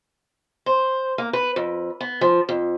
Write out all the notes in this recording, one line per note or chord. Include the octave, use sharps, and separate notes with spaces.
C5
A#3
B4
F2
B3
F3
F2